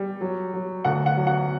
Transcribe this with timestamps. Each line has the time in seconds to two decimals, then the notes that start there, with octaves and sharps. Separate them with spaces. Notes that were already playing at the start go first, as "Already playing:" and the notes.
Already playing: G3
0.21 F#3
0.53 F#3
0.85 D2 F#5
1.06 F#5
1.17 F#3
1.27 F#5